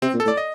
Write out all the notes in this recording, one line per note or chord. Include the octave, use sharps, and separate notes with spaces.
C3 C4
A#2
A4
A2 D5
D#5